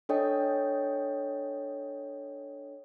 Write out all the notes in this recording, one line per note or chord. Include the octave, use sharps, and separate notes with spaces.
D4 A4 C#5 D#5 G5